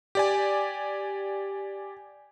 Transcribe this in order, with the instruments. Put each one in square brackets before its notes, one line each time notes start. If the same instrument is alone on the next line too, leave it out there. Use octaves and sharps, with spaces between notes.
[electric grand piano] G4 D5 G#5